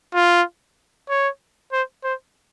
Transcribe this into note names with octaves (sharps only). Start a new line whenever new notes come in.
F4
C#5
C5
C5